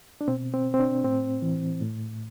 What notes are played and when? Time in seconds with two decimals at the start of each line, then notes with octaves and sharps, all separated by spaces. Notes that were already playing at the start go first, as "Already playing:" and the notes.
0.21 D4
0.28 B2 C4
0.54 C4
0.74 C4
0.79 D4
1.04 A2 C4
1.42 E3
1.81 A2